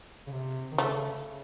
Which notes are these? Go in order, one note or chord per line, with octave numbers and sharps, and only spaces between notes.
C#3
C3
D#3
C#3 A3
C#3